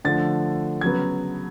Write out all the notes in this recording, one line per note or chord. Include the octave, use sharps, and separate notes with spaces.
D3 F3 A3 A6
C#3 F#3 B3 G#6